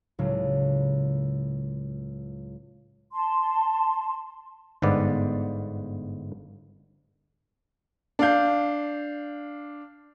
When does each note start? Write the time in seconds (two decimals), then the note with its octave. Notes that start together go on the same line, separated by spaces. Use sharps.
0.19 C#2 A2 C#3 F#3
3.13 A5 C6
4.82 G1 G#2 D3 B3 D5
8.19 D4 F5 G6